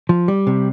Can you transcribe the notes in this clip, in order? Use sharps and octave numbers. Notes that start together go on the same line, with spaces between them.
F3
G3
C3